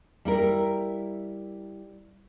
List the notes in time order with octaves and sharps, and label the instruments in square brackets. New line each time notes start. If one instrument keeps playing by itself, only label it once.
[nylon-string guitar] G3 E4 A#4